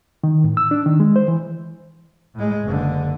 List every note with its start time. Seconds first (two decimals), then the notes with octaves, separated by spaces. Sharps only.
0.24 D#3
0.44 A2
0.57 E6
0.71 D4
0.86 D#3
1.00 G#3
1.16 C5
1.28 E3
2.35 A2 G#3
2.64 F#1 D3